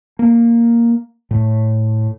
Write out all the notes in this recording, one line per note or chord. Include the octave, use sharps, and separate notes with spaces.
A#3
A2